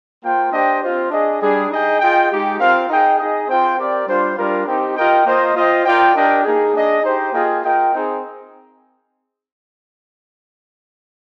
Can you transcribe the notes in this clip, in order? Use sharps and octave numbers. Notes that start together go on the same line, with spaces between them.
A#3 F4 C5 G5
D4 G4 C5 D#5 G5
C4 F4 C5
D4 G#4 D#5
G3 D4 G#4
D#4 G#4 D#5 G5
F4 G#4 D#5 G5
G#3 D#4 G4
C4 F4 A#4 F5
D#4 G#4 D#5 G5
D#4 G#4 D#5
C4 F4 C5 G5
C4 G4 A#4 D5
G3 D4 F4 C5
G3 D4 F4 A#4
C4 D#4 G4
F4 A#4 D#5 G5
A#3 F4 C5 D#5
F4 C5 D#5 G5
F4 A#4 D5 G5
D4 G4 A#4 D#5 G5
A#3 D#4 G#4
D4 G#4 D#5
D#4 G4 C5
A#3 F4 G#4 D#5 G5
F4 A#4 D#5 G5
C4 D#4 G#4